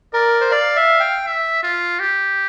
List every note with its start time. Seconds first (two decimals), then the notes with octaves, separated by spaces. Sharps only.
0.13 A#4 D5
0.41 C5
0.51 D5 F5
0.76 E5
1.00 G5
1.26 E5
1.63 F4
2.00 G4